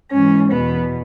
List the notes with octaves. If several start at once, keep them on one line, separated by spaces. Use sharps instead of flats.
G#2 E3 C#4
E2 B2 B3